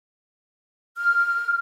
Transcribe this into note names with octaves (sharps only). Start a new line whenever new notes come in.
F6